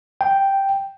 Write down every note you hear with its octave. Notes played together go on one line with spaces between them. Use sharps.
G5